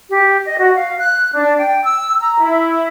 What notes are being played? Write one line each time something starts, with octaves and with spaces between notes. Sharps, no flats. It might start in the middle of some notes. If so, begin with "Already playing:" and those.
G4
D#5
F#4
F5
F#6
D4
G5
E6
A#5
E4